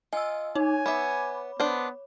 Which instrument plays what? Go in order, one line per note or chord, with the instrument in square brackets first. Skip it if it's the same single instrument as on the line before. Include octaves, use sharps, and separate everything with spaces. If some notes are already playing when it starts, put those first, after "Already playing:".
[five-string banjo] F4 [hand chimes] D#5 [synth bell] G#5 E6
[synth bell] D#4 [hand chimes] C#5 [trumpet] G#5
[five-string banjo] B3 E5 [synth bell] B5 D6
[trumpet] B3 [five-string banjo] D4 C5